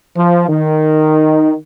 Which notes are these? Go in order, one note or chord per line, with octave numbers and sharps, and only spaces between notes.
F3
D#3